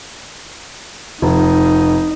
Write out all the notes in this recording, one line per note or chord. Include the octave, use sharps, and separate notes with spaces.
F1 D#4